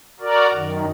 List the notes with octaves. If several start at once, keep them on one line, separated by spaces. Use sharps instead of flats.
F#4 A#4 D5
F#2 D#3